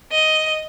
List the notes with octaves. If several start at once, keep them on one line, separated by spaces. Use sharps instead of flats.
D#5